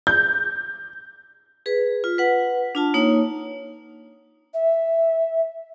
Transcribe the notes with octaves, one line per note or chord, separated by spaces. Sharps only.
G6
G#4 B4
F4
B4 F#5
D4 F4 A5
A#3 D#4 C#5
E5